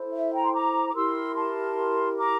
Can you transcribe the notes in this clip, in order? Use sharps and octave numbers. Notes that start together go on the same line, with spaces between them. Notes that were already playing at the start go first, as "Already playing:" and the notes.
Already playing: E4 A4 C5
E5
G5 A#5
C6
A#5 D6
D6
E4 G4 A#4 C6 E6
A5 C6
A#5 D6